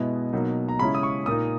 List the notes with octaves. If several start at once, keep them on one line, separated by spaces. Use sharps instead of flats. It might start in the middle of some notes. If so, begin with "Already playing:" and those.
Already playing: B2 G#3 B3 E4 D#5
B2 F#3 A#3 D#4
A#5
C#3 G#3 C#4 E4 B5
D#6
C#6
A#2 A#3 D#4 D#6